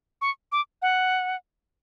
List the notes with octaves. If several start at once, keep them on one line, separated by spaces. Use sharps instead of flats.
C#6
D6
F#5